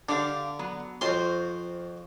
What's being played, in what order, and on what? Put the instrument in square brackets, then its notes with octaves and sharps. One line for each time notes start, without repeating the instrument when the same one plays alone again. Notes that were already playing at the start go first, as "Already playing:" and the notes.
[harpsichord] D3 [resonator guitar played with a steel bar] D4 G4 F5
[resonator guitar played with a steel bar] F#3 B3
[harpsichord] F2 C6 [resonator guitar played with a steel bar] F4 F#4 C5